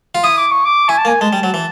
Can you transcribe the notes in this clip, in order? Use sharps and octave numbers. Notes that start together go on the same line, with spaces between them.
F4
E4 D#6
D6
C#6
D6
E4 G#5
A5
A#3
G#5
G#3 A5
G3
F#3
E3